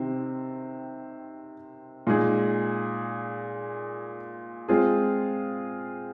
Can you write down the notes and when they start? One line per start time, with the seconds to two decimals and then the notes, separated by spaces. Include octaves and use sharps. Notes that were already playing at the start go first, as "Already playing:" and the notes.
Already playing: C3 D#3 C4
2.07 A#2 G#3 D#4 G#4
4.69 G#3 C4 F4 G#4